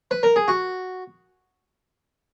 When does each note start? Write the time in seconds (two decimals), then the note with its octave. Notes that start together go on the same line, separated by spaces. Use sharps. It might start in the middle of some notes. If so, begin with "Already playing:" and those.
0.11 B4
0.23 A#4
0.36 G#4
0.48 F#4